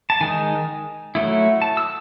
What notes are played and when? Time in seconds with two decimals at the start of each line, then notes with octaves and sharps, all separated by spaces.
0.10 A5
0.21 D#3 G#3 D#4 G#5
1.15 F#3 A3 E4
1.62 A5
1.77 E6